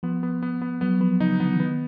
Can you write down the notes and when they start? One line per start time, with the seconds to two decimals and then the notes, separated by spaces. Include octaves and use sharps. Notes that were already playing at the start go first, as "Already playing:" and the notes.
0.03 F3 B3
0.23 B3
0.43 B3
0.62 B3
0.81 F#3 B3
1.01 F3 B3
1.20 C#3 D#4
1.40 D3 B3
1.53 E3
1.60 D#3 B3